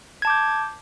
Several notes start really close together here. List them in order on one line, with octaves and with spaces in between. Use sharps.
G#6 A5 D6 G6